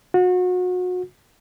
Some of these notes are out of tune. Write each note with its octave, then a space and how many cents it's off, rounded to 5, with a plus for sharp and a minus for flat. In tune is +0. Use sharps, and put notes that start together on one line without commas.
F#4 -30